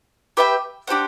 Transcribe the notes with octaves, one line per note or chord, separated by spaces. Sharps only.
G4 B4 E5 G5
D4 G4 C5 F#5